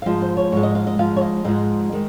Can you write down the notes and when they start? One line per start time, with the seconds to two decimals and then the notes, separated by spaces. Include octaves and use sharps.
0.02 F5
0.06 G#2 F3 G#3 D#5
0.22 C5
0.37 C#5
0.52 G#2 F3 G#3 C#5
0.63 D#5
0.75 F5
0.87 D#5
0.98 G#2 F3 G#3 F5
1.16 C#5
1.21 D#5
1.44 G#2 F3 G#3 D#5
1.92 D#3 G#3